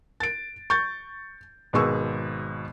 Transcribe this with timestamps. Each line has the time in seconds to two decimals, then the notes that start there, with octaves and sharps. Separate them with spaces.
0.20 A6 D7
0.70 C#6 G6 A6
1.73 G#1 B2 G#4 C#6 E6